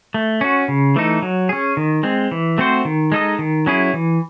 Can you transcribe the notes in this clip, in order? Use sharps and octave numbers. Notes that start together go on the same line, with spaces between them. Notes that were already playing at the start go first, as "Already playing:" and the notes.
A3
C#4 F#4
C#3
E3 A3 D#4 A4
F#3
C#4 G#4
D#3
G#3 C4
E3
A3 C4 F#4 C5
D#3
G#3 D#4 A4 D#5
D#3
F#3 C#4 E4 G#4
E3